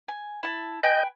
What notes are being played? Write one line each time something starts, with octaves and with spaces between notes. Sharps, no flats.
G#5
E4 A5
B4 D#5 G5 G#5 G6